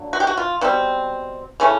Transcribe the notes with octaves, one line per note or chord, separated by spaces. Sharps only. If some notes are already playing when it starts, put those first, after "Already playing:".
Already playing: F#3 A#3 D4
F#4
G4
F#4
F4
B2 G3 C4
C#3 E3 A3 C#4